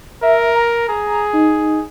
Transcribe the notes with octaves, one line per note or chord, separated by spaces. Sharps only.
A#4 E5
A#5
G#4
D#4